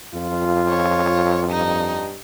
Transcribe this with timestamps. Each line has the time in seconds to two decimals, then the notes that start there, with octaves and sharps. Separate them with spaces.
0.14 F2 F4
0.69 C#5
1.50 G2 D#4